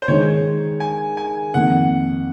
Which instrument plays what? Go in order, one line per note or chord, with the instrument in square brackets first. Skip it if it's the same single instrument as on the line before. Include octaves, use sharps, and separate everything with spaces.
[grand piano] C5
[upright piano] D#3 G#3 D#4 [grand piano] C#5
[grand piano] G#5
G#5
[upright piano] F2 D#3 A#3 [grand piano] F#5